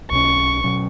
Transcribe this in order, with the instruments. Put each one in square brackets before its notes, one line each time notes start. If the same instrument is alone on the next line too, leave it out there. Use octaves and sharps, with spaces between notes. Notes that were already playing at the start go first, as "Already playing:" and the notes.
[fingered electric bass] B1 B2 F#3 C#4 [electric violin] C#6
[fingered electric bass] B2 F#3 C#4